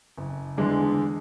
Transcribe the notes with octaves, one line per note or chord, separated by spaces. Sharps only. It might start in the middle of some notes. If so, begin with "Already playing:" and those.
F#1
E2 D3 G#3 D4